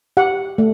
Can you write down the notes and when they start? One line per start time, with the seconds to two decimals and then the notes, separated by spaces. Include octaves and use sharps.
0.17 G4 F#5
0.58 A3